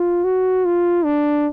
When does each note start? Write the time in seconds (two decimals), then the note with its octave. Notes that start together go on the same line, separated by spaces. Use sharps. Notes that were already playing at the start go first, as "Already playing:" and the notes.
Already playing: F4
0.24 F#4
0.65 F4
1.05 D4